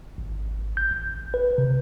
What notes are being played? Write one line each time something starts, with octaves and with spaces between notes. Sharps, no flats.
G#1
G6
A1
B4
C3